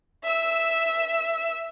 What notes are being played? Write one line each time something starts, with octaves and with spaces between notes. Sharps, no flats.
E5 E6